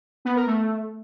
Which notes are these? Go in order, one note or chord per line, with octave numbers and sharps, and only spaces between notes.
B3
A#4
A3